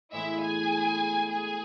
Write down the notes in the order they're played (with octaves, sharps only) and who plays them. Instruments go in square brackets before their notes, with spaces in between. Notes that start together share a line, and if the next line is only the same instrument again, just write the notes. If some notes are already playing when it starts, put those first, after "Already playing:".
[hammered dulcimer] A2 E3 G#3 B3 [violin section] E4 E5
[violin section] G#4 G#5
G#4 G#5